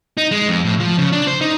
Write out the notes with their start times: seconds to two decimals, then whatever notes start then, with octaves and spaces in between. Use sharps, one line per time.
0.17 D#4
0.31 G#3
0.48 F2
0.65 A2
0.80 F3
0.98 C#3
1.12 D4
1.27 C5
1.41 D#4